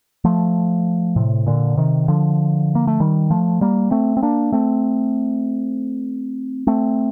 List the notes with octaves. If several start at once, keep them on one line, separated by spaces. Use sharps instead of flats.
F3 A3
A2 C3
A#2 D3
C3 D#3
D3 F3
A#3
A3
D#3 G3
F3 A3
G3 A#3
A3 C4
C4
A#3 D4
A3 C4
A3 C4